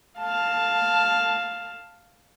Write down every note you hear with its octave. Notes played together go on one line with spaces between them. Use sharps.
F5 A5